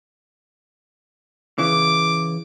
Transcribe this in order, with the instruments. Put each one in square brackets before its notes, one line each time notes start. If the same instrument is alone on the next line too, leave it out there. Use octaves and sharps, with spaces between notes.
[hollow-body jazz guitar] C#3 E3 [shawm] D6